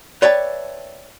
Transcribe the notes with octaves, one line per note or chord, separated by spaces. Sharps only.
B4 C#5 D5 E5 G5 A5